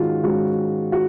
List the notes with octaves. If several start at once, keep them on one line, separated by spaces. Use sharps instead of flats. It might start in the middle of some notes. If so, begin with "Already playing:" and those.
Already playing: G#2 D#3 G#3 C#4 F4 F#4
G#2 D#3 G#3 C#4 F#4
F#4